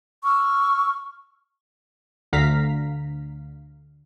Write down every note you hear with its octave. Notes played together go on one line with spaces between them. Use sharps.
C#6 E6 F6
D2 D3 F5 A#5 B6